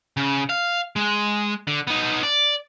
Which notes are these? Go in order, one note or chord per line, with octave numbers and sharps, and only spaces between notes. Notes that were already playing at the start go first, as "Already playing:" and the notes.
C#3
F5
G#3
D3
B3 D#4
D5